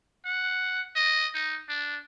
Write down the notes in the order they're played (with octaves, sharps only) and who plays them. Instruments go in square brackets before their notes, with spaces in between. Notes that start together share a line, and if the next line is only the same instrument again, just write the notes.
[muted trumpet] F#5
D#5
D#4
D4